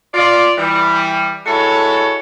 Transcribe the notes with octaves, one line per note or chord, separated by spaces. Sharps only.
F4 D5
E3 G3
G#3 E4 F#4 A4 C#5